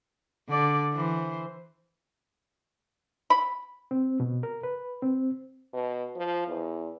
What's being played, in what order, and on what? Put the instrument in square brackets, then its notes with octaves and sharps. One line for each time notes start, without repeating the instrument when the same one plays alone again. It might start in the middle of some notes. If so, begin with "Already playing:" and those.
[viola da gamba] D3 D5
E3 C5
[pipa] B5
[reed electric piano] C4
B2
A#4
B4
C4
[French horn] B2
F3
E2